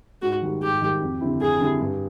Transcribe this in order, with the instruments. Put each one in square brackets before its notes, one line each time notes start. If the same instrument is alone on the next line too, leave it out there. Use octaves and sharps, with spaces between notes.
[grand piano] G#2 [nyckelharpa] F#4
[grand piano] D#3 G3
[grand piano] G#2 [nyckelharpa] G4
[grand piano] D#3 G3
F2
D3 G3 C4 E4
[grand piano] F2 [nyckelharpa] G#4
[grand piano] D3 G3 C4 E4
G2